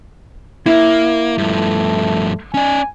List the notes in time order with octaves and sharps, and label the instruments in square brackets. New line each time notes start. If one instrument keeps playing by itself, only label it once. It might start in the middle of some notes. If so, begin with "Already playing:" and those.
[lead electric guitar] A#3 [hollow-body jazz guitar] E4
[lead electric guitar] G2 F3 [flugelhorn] A3
[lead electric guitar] C#4 D5 [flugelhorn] G#5